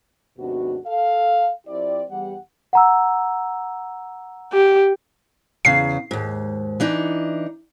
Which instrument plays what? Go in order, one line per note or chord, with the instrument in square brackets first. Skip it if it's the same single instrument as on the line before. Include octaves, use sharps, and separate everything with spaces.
[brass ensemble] D#2 G#2 C3 B3 D4 F#4
A4 F5
F3 C4 E4 G4 D5
E2 G3 G4 F#5
[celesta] F#5 A#5 E6
[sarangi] G4
[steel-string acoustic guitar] E2 C#3 [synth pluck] C7
[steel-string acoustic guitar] D#2 G#2
E3 D4 D#4